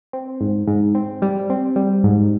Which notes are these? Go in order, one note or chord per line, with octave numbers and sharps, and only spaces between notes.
C4
G#2
G#2
C4
G3
C4
G3
G#2